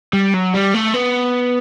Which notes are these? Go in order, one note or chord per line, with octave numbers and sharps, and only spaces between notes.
G3
F#3
G3
A3
B3